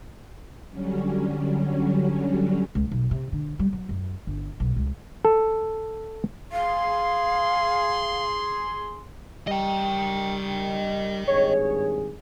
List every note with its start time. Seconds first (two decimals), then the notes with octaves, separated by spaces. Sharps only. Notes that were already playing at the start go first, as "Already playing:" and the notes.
0.70 D3 F#3 G3 C#4
2.75 C#2
2.92 B1
3.11 C3
3.32 D3
3.59 G3
3.73 F#3
3.89 F#2
4.27 G1
4.60 B1
4.76 C#2
5.25 A4
6.52 G#4 F5 C6
9.47 G3 D#5 G5
11.27 G#1 G2 G#4 C#5